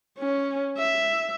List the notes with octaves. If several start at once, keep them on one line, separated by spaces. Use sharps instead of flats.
C#4
E5